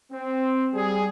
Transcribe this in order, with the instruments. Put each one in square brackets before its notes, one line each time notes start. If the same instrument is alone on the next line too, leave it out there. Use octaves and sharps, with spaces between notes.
[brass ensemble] C4
G3 G#4